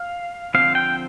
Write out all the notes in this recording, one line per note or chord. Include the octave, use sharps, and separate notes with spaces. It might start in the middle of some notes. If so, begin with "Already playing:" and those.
Already playing: F5
D3 F3 C4 F5
G5